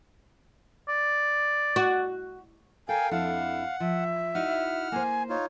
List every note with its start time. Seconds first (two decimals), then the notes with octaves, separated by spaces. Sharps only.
0.88 D5
1.76 F#4
2.89 A4 A#4 F5 G5 G#5
3.11 F2 D4 E4 F5 F#5
3.80 F3 E5
4.35 D#4 E4 F#4 F#5 F6
4.92 A#3 C5 G#5
5.29 D#4 F4 C#5